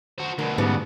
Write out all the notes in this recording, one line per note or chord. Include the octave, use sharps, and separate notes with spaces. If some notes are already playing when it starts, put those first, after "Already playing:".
F#4 C5
D2 B2 A#4
G#2 C#3 G3 B3